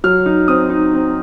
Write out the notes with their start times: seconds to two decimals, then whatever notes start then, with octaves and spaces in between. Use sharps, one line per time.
0.04 F#3 F6
0.26 D#4
0.48 C4 D#6
0.70 D#4
0.93 C4